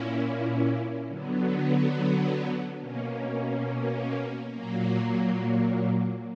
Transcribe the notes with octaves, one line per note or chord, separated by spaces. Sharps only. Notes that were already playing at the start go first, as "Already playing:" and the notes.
Already playing: A#2 A#3 C#4 E4
D3 F#3 B3
B2 A#3 C#4
A#2 F#3 A#3